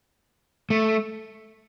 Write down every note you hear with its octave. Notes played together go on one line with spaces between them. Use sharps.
A3